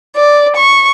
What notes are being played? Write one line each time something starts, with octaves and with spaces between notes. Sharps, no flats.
D5
C#6